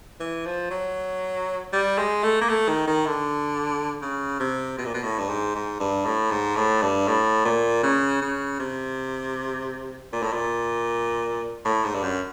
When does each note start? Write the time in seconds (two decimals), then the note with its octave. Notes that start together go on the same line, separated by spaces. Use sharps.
0.20 E3
0.46 F3
0.71 F#3
1.73 G3
1.98 G#3
2.24 A3
2.41 A#3
2.49 A3
2.69 D#3
2.88 D#3
3.07 D3
4.02 C#3
4.40 C3
4.78 B2
4.86 A#2
4.94 B2
5.03 A2
5.19 G2
5.29 G#2
5.55 G#2
5.80 G2
6.06 A2
6.31 G#2
6.56 A2
6.82 G2
7.08 A2
7.45 A#2
7.83 C#3
8.22 C#3
8.60 C3
10.13 A#2
10.23 A2
10.33 A#2
11.65 A2
11.84 G#2
11.94 G2
12.03 F#2